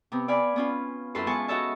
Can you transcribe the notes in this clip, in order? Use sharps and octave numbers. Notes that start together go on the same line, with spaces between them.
C3 B3
D5 F5 G#5 B5
B3 C#4 F4
F#2 E4 A4 B4 C6
G#3 B3 F4 G#5 A5 C#6
F#4 A4 C#5 D#5 E5 A5